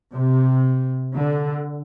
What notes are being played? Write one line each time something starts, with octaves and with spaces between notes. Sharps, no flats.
C3
D3